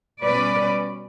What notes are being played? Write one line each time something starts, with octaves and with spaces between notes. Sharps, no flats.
B2 G3 C#4 B4 D5